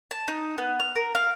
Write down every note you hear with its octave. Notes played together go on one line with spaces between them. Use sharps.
A5
D#4
B3
F6
A#4
F5